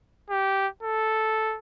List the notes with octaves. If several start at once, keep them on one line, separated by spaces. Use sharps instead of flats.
G4
A4